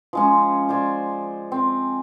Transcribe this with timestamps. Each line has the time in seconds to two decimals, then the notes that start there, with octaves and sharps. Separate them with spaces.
0.13 F3 G#3 C#4
0.69 C5 D5 G#5
1.52 C4